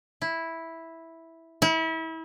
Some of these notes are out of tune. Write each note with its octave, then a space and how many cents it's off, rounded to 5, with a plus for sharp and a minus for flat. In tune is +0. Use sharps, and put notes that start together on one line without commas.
E4 -5
E4 -30